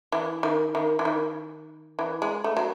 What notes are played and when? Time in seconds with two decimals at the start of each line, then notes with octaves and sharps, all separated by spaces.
0.12 E3
0.43 D#3
0.75 D#3
0.99 E3
1.05 D#3
1.99 E3
2.22 G#3
2.44 A3
2.57 F#3